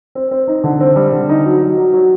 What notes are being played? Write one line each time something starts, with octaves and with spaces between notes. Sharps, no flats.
C4
C4
D#4
D3
C4
G3
D3
D#4
F#3
F#3
F#3
F#3